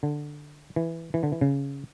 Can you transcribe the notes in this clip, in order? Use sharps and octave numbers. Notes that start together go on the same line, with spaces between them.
D3
E3
E3
D3
E3
C#3